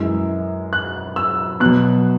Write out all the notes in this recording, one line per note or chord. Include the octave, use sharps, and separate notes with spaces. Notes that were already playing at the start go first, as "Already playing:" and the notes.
Already playing: F#2 E3 G#3 E6
F#6
E6
B2 F#3 F#6